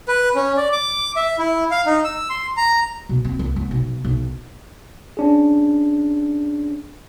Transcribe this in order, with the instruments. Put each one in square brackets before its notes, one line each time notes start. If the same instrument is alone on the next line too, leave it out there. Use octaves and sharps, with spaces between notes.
[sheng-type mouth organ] B4
C#4
D5
D6
E5
E4
F5
D#4
E6
C6
A#5
[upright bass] B2
C4
C#2
G#1
B1
B1
[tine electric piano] C#4 D4 G#4